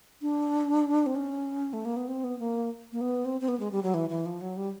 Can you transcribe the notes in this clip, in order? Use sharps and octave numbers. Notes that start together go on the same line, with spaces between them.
D4
C4
C#4
A3
A#3
B3
C4
B3
A#3
A#3
B3
C4
C4
B3
G#3
G3
F#3
E3
E3
F3
F#3
G3